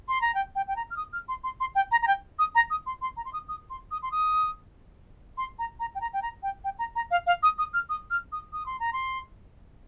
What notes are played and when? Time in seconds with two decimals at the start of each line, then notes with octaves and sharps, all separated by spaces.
0.09 C6
0.21 A#5
0.35 G5
0.55 G5
0.68 G5
0.76 A#5
0.91 F6
0.97 D#6
1.13 F6
1.29 C6
1.44 C6
1.60 C6
1.75 G5
1.92 A#5
2.02 A#5
2.07 G5
2.39 D#6
2.55 A#5
2.70 D#6
2.86 C6
3.02 C6
3.17 A#5
3.25 C6
3.33 D#6
3.49 D#6
3.70 C6
3.91 D#6
4.03 C6
4.12 D#6
5.38 C6
5.59 A#5
5.80 A#5
5.95 G5
6.01 A#5
6.13 G5
6.22 A#5
6.43 G5
6.64 G5
6.79 A#5
6.96 A#5
7.11 F5
7.27 F5
7.43 D#6
7.58 D#6
7.74 F6
7.89 D#6
8.11 F6
8.32 D#6
8.53 D#6
8.66 C6
8.80 A#5
8.93 C6